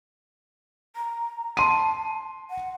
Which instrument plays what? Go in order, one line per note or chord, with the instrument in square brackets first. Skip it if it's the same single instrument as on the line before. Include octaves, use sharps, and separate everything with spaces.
[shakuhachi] A#5
[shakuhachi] A5 [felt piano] C6 D#7
[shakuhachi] F#5